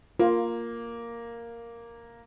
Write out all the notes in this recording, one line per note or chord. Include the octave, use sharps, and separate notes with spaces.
A#3 F4